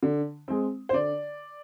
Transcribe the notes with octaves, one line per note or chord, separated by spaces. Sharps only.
D3
G#3 C4
C5
D3 D5